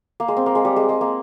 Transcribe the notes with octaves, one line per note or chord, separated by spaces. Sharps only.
A#3
G#3
C4
A#3
G#3
G3
G#3
G#3
A#3